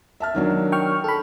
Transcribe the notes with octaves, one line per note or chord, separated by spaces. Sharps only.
E5 A5 F6
D#3 F#3 D4
G5 C#6 F6
A4 B5